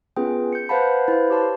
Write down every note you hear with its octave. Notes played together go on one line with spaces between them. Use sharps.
B3 C#4 F4 G#4 B4 G5
G6 C#7
B4 C5 F5 F#5 A5 B5
E4 B4 C5 F5
G4 C#5 A5 C6